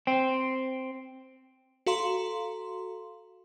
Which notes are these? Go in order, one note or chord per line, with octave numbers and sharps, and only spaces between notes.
C4
F#4 A4 F5 A#5 C6